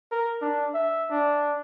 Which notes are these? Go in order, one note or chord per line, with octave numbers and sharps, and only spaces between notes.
A#4
D4
E5
D4